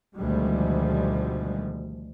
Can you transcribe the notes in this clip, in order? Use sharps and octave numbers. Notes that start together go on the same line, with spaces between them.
D2 B2 D#3 F3 G3 G#3